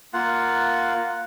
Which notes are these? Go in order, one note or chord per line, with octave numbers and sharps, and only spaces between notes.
A#3 F4 F#5